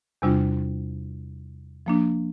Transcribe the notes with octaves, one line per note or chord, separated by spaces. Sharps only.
E2 C3 G3 D4 F4
F3 A#3 D4